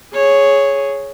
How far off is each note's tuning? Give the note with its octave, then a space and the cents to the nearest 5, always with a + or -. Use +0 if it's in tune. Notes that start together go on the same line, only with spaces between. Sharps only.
G#4 +0 C#5 +0